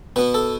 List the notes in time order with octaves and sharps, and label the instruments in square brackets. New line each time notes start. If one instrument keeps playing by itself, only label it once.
[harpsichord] B2 B3 B4
A4